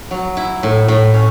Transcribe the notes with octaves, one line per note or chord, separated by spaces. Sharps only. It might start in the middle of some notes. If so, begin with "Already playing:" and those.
F#3
E4
A2
A2
C#4